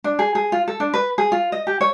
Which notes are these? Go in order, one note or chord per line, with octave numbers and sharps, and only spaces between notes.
D4
G#4
G#4
F4
A4
D4
B4
G#4
F4
D#5
G4
C#5